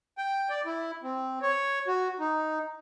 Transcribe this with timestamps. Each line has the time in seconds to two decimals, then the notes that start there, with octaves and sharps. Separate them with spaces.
0.18 G5
0.50 D5
0.66 E4
1.03 C4
1.42 C#5
1.88 F#4
2.20 D#4